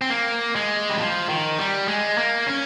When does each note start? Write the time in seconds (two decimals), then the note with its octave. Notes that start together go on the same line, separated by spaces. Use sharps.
0.01 C4
0.10 A#3
0.55 G#3
0.89 G3
0.99 F3
1.29 D#3
1.58 G3
1.88 G#3
2.18 A#3
2.47 C#4